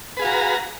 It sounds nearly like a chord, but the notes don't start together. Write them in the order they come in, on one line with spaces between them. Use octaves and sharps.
B4 G#4 F5 F#4 A#5